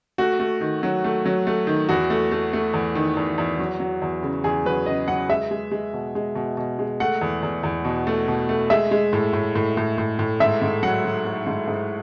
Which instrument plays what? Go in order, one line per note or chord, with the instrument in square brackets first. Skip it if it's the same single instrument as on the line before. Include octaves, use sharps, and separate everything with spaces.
[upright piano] A3 F#4
A3
D#3
F#3
A3
F#3
A3
D#3
E2 F#4
A3
A3
A3
E2
D#3
E2
E2
F#3
F#3
E2
C#3
E2 G#4
F#3 B4
C#3 D#5
F#3 F#5
G#3 E5
G#3
G#3
B2
G#3
B2
B2
G#3
A3 F#5
E2
E2
E2
B2
A3
B2
A3
G#3 E5
G#3
A2
A2
A2
A2
A2
A2
G#2 E5
G#2
F#3 F#5
F#3
A3
G#2
G#2